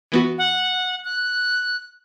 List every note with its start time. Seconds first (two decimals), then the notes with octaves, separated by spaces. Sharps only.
0.12 E3 B3 F#4
0.38 F#5
1.05 F#6